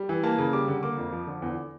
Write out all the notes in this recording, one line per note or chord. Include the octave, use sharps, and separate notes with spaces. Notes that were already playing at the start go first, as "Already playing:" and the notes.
Already playing: G3
E3
A#3 A5
C#3
G3 D6
D3
A#3 D6
F2
F3
D3
E2